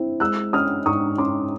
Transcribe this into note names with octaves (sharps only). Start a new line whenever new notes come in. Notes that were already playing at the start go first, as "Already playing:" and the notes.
Already playing: C4 E4
G#3 E6 F#6
C#4 D#6 F6
G#2 C#6 D#6
C#4 C6 D6